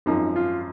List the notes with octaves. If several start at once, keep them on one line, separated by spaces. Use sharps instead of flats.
G#1 F#2 F3 D#4
F4